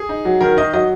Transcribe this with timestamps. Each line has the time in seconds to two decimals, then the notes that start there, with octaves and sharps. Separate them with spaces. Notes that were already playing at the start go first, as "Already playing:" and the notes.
Already playing: G#4
0.09 D#4
0.25 F#3
0.41 D#3 A#4
0.57 D#3 D#5
0.73 F#3 D#5